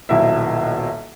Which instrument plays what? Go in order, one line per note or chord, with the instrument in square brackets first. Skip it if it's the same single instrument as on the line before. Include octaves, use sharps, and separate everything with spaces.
[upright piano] D#1 B1 B2 E4 E5